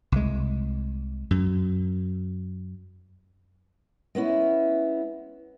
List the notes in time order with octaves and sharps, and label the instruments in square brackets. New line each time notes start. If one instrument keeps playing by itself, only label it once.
[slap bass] C2 G#3
F#2
[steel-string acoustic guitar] G#3 B3 C#4 E4